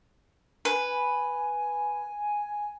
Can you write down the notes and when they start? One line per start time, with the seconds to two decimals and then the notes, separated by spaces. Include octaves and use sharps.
0.65 B4 G#5